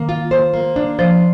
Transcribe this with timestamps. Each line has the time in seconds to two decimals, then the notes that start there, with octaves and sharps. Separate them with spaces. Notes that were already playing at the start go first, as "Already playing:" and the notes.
Already playing: D#3 A#3
0.09 F4
0.31 C5
0.54 A#3
0.76 D4
0.99 F3 C5